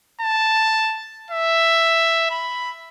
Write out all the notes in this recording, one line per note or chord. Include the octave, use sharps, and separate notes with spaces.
A5
E5
B5